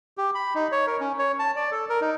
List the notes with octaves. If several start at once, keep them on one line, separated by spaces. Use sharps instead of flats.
G4
B5
D#4
C#5
A#4
C#4
C#5
A5
D5
A4
A#4
D#4